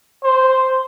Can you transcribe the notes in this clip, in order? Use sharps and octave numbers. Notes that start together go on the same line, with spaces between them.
C5